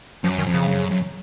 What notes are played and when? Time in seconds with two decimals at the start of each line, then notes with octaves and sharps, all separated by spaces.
0.24 F#2 F3
0.38 D#3
0.46 F2
0.54 C#3
0.68 F#2
0.91 F#2